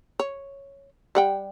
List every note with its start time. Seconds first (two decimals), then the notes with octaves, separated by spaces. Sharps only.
0.19 C#5
1.15 G3 F#5 G5